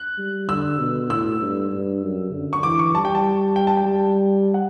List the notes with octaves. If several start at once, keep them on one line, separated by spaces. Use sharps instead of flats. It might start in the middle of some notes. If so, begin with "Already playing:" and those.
Already playing: F#6
G3
D3 E6
B2
A2 E6
G2
G2
F#2
D3
C#6
E3 D6
C#6
G3 A5
G5
A5
G5
A5
G5
G3
F#5